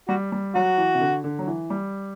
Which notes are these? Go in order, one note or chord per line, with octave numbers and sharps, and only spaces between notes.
G3 F#4
G3
F#3 F#4
E3
C3
D3
D3
F#3
E3
G3